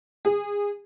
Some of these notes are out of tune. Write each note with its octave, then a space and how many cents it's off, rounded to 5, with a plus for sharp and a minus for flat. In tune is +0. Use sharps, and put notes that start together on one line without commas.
G#4 -25